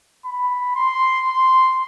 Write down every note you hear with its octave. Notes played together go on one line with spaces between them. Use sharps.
B5
C6
C6